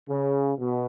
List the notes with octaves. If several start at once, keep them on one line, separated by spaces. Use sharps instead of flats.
C#3
B2